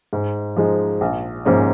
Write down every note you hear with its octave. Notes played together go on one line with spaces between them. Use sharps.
G#2
F3 G#3 D#4
A#1
G#2 F3 A#3 C#4